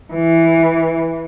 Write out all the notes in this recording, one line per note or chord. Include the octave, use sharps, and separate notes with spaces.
E3